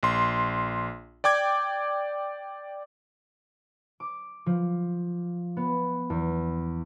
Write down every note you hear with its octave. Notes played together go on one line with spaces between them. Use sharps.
A#1 C6
D5 G5 D6 G#6
D6
F3
B3
E2